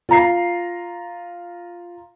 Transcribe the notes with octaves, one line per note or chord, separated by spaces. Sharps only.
F4 A#5 C7